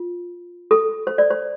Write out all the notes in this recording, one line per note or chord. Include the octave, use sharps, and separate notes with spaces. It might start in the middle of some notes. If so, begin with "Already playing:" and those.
Already playing: F4
A4
C5
D5
C5